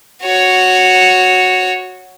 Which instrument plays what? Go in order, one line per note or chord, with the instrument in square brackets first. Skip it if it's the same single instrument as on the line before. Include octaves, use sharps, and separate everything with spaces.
[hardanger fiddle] F#4 C#5